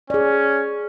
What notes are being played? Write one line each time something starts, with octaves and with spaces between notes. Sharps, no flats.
C#4 G#4 D5